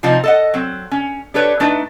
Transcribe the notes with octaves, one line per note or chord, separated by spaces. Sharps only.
C3 F3 C4 D#4 F4
A4 D#5 F#5
F#3 C4
C#4
D4 G4 A4 B4 C#5
A3 D4 D#4 B4